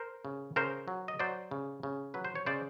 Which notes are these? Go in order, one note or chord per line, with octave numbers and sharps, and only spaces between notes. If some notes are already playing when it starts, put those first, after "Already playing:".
Already playing: A#4 C5
C#3
C#3 A#4 C5
F#3
D#5
F#3 C5 D5
C#3
C#3
F#3 B4
C5
C#5
C#3 C5 D5